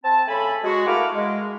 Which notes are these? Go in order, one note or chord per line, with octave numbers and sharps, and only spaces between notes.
C4 A5
C#3 A3 A4 G#5 B5
G#3 F#4
A3 A#3 E4 F#5 D6 F6
G#3